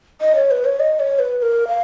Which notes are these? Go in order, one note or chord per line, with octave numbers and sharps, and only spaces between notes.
D#5
C#5
B4
C#5
D#5
C#5
B4
B4
A#4
F5